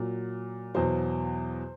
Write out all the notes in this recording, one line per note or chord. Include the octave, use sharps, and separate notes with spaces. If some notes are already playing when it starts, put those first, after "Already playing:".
Already playing: A#2 F#3
E2 B2 F#3 C5